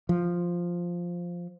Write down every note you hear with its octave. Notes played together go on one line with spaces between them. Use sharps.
F3